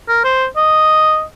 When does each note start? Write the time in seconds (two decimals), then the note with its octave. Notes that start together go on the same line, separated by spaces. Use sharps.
0.09 A#4
0.24 C5
0.57 D#5